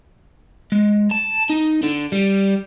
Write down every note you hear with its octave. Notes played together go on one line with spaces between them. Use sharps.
G#3
A5
D#4
D3
G3